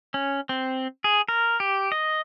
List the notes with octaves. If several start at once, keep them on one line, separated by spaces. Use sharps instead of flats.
C#4
C4
G#4
A#4
G4
D#5